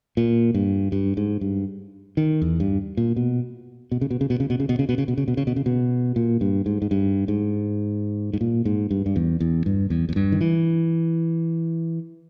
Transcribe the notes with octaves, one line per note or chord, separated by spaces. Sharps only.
A#2
G2
G2
G#2
G2
D#3
E2
G2
A#2
B2
B2
C#3
B2
C#3
B2
C#3
B2
C#3
B2
C#3
B2
C#3
B2
C#3
B2
C#3
B2
C#3
B2
A#2
G2
G#2
G#2
G2
G#2
G#2
A#2
G#2
G2
G2
E2
E2
G2
E2
E2
G2
D#3
E3